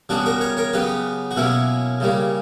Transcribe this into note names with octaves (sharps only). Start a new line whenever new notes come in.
C#3 G3 B3 D4 F#4
F#4 A#4
A#4 C#5
A#4 C#5
C#3 F#3 B3 G4 B4
F#4
B2 F#3 A#3 C#4 E4
C#3 G3 A#3